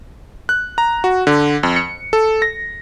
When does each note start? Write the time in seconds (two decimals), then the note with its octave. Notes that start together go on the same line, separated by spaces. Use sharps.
0.49 F#6
0.78 A#5
1.04 F#4
1.27 D3
1.63 F2
1.76 C#7
2.13 A4
2.42 A#6